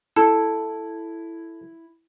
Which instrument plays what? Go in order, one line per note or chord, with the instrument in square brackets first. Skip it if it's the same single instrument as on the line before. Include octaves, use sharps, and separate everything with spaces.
[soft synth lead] E4 [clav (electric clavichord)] A4